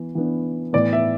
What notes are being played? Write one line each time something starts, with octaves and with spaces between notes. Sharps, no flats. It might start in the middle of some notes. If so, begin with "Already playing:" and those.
Already playing: E3 B3
E3 B3 D4
A2 E3 B3 D5
E5